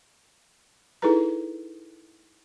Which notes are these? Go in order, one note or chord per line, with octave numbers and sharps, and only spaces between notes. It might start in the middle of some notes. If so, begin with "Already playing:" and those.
D#4 E4 G#4 A4 B4 A#5